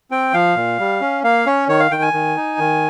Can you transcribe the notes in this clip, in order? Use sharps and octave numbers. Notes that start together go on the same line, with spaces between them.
C4 G5
F3 F5
A#2
G3
C#4
A#3 F5
C#4 C#5
D#3 C#5
F5
D#3 G5
G#5
D#3
D#4
D#3